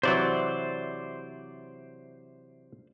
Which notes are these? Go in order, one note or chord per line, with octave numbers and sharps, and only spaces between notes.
C3 E3 F#3 C5 D5